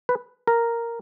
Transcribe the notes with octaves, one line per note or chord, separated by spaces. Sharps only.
B4
A#4